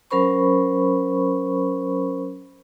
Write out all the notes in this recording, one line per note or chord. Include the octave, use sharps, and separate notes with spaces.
F#3 C#4 A#4 C5 B5 C#6